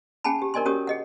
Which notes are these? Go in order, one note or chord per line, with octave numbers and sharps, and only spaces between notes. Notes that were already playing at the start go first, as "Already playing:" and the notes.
C#4 G#4 F#5 G#5 A5 B5
G4
D4 A#4 D5 D#5 G#5 C6
C#4 F#4 G4 A#4 C#5 D#6
G#4 D#5 F#5